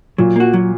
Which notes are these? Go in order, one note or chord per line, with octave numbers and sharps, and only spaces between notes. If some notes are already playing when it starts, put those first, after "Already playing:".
A#2 F#3
A#3 F#4
F#3